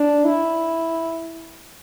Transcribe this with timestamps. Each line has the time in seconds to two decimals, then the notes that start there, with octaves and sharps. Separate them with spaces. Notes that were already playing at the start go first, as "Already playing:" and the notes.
Already playing: D4
0.25 E4